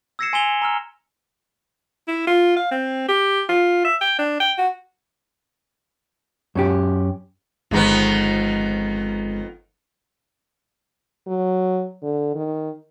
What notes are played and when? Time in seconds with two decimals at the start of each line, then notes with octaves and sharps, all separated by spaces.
0.19 E6 G#6 A#6 C7 C#7 E7
0.33 G#5 C6 B6 E7 F7 G7
0.62 A#5 E6 F6
2.08 E4
2.27 F4
2.56 F5
2.71 C4
3.08 G4
3.49 F4
3.85 E5
4.01 G5
4.19 D4
4.40 G5
4.58 F#4
6.55 F#2 C#4 G4
7.71 G1 F2 D#3 G#3 B3 A#5
11.27 F#3
12.03 D3
12.35 D#3